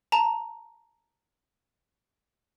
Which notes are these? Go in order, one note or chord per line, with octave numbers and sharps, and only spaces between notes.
A5 A#5